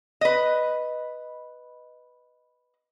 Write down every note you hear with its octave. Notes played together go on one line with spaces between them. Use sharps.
B4 D#5